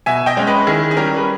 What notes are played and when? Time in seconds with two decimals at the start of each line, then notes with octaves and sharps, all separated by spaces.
0.06 B2 E5 G#5
0.26 D#5 G5
0.37 G#3 C#4
0.47 B4 D#5
0.67 D#3 E4 G#4
0.91 G#4
0.97 G3 C#4 G4 A#4
1.16 B4